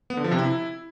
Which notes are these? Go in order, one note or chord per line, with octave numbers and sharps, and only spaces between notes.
B3
D3
F3
C3
E4